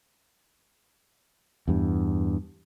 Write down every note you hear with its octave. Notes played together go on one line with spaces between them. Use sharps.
E2 G2